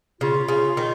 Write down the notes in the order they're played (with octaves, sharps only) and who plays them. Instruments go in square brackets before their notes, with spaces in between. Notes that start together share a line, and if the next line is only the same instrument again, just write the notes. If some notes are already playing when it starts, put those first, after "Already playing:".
[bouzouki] C#3 [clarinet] F4
[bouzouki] C#3
D#3